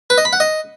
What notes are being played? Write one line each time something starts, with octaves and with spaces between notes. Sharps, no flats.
B4
D#5
B5
F#5
D#5